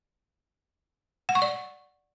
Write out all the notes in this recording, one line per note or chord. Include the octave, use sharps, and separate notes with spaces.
F#5
C#6
D5